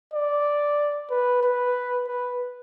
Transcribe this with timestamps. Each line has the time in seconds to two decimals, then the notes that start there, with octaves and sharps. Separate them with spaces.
0.13 D5
1.10 B4
1.43 B4
2.08 B4